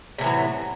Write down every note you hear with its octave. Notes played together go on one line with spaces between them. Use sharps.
A2 C3 E3 F#3